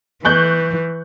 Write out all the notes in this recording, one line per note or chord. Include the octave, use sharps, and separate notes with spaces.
E3 C#6 F#6 G6